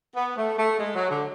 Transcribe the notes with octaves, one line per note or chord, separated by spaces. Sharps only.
B3
A3
A3
G#3
F#3
D3